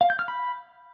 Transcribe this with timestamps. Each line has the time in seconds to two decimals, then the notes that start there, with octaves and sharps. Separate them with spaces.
0.01 F5
0.10 G6
0.19 F6
0.28 B5